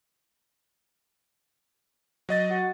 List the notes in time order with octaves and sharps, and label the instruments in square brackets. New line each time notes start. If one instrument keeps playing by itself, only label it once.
[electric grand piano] F#3 D#5 A6
[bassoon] F#4